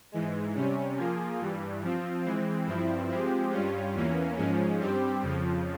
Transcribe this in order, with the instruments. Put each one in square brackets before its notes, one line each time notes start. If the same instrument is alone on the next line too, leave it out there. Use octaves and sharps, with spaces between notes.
[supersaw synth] G#2 E3 G#3
C3 G3 C#4
F3 A#3 F4 G#4
G2 E3 G3
F3 C4 F4
E3 G#3 C4
G2 F3 C4 E4
F3 G#3 C4 G4
G2 G3 C#4 F4
E2 E3 A#3 C#4
G#2 F3 G#3 C#4
G2 G3 C4 G4
F2 C#3 F3